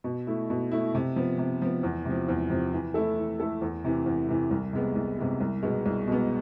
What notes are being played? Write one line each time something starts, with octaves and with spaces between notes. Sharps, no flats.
B2
A3 E4
B2
A3 E4
C3
F3 B3
C3
F3 B3
E2
C3 F3
E2
C3 F3
E3
A3 E4 A4
E3
A3 E4 A4
E2
C3 E3
E2
C3 E3
C2
C3 G#3 B3
C2
C3 G#3 B3
C2
B2 G#3 B3
C2
B2 G#3 B3